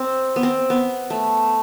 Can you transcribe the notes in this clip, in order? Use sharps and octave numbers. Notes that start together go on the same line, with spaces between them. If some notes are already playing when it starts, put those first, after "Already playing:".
Already playing: C4
B3
C4
B3
A3